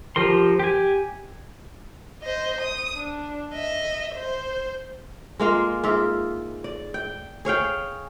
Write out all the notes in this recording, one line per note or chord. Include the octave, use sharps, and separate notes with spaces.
F3 G4 A#4 C6
G4 G#5
C5 D#5
D#6
D4
D#5 E5
C5
G#3 A#3 F4
G#2 F4 E5
D5
G5
G#4 C#5 F5 G5